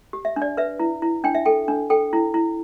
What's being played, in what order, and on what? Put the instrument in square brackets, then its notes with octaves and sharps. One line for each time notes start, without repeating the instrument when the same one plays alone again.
[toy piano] G4
E5
D4
D5
B4 E5
E4
E4
D4 G5
E5
A4 G5
D4
A4 G5
E4
E4